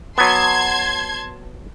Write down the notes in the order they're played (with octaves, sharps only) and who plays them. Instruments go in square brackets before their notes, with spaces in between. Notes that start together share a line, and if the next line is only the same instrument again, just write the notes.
[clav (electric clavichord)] F#3 B3 [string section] A5 C6 G#6